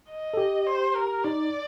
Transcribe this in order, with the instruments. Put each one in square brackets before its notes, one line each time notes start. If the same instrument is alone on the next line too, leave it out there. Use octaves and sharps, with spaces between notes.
[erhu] D#5
[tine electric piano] A4
G4
[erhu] C5
A#4
[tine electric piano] D#4 [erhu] D5